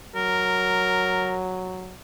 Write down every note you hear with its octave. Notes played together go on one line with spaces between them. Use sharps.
F#3 A#4